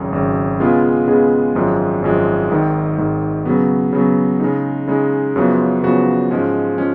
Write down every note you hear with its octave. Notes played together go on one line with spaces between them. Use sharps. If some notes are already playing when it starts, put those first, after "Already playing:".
Already playing: G#1 F#2 C#3
G#1 F#2 C#3
C#3 G#3 B3 F4 G#4
C#3 G#3 B3 F4 G#4
G#1 F#2 F3 G#3
G#1 F#2 F3 G#3
G#1 G#2 D#3
G#1 G#2 D#3
C#3 F#3 B3
C#3 F#3 B3
C#3 G#3 D#4
C#3 G#3 D#4
F#2 C#3 F3 B3 F#4
F#2 C#3 F3 B3 F#4
G#2 F3 G#3 C#4
F3 G#3 C#4